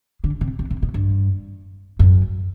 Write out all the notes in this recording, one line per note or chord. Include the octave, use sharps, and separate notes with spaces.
D3
C3
C3
C3
B2
G2
F#2